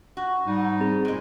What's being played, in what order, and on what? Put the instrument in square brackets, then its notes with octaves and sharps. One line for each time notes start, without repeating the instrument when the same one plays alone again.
[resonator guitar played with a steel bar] F#4
[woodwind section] G#2 G3 D#4
[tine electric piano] C4 G#4
[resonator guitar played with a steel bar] A#2 G#3